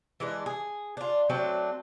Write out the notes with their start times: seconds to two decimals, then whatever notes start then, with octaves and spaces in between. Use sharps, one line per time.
0.20 E3 G#3 D4
0.46 G#4
0.97 D4 F4
1.29 F#3 A3 C4 D4